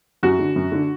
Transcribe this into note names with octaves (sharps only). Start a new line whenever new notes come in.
F#2 F#4
D3
F#2
D3